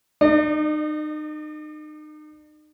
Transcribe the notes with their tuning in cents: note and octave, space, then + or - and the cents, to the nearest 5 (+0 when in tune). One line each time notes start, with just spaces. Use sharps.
D#4 -35 D5 +45